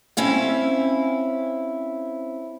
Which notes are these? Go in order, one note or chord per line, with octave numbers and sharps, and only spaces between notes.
C4 C#4 E4 F5